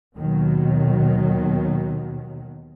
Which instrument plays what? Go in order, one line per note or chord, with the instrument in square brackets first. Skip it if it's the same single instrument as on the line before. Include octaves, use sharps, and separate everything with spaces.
[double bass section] D#2 B2 D#3 F#3